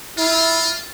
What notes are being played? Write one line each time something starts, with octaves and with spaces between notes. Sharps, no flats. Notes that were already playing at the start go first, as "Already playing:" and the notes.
E4 F4